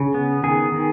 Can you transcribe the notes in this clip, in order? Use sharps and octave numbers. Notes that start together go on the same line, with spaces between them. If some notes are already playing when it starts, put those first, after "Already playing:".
Already playing: C#3
B3
D#3 G#4
D#3